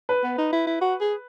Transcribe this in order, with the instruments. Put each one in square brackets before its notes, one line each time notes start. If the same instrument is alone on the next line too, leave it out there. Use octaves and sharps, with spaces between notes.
[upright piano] B4
[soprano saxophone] B3
D#4
E4
E4
F#4
G#4